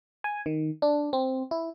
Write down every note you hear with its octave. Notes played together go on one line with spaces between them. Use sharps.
G#5
D#3
D4
C4
E4